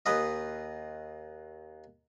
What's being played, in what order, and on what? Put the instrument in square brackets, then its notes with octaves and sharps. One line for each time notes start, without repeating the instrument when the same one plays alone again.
[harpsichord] D#2 B4 D#5